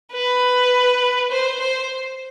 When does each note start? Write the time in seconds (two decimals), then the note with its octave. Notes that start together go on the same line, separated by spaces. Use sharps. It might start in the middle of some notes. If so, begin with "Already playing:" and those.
0.13 B4
1.31 C5
1.61 C5